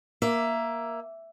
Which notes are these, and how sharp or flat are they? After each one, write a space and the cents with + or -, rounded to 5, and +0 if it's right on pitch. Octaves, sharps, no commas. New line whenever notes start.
A#3 +10 E5 +10